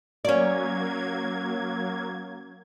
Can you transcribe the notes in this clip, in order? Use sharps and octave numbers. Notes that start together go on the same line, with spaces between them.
F#3 A#3 C#4 D5 G#6